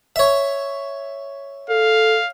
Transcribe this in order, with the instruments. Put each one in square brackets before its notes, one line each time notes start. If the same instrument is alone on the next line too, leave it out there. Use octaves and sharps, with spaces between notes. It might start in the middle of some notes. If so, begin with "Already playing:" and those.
[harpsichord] C#5 E5
[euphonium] A4 [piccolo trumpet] F5